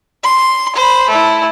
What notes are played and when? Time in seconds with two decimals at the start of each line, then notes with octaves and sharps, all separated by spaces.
0.24 C6
0.76 C5 B5
1.10 A3 E4